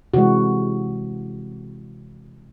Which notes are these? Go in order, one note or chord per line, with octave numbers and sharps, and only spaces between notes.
C3 E3 G#3 F#4